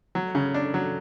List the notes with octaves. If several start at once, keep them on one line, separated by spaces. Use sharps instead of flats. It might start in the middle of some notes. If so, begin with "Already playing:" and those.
F#3
C#3
D4
F#3